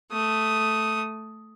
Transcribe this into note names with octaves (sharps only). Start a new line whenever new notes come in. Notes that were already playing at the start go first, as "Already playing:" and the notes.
A3 D#6